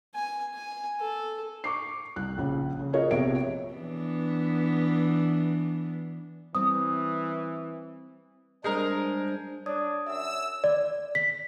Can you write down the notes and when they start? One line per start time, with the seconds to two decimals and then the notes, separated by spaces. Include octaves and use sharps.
0.14 G#5
0.54 G#5
1.00 A4
1.64 C#6 D6 C7
2.16 C2 F#6
2.38 A#1 C#3
2.79 C#3
2.93 F4 F#4 G#4 A#4 C#5 D#5
3.11 A#1 C3 B3 C#5 E5 D7
3.73 E3 B3 D4
6.55 E3 G3 C4 D#6
8.64 G3 G#3 D4 G#4 A#4 C5
9.66 D4 C#5 D#6 G#6
10.07 F#2 E5 E6
10.64 D5
11.15 B6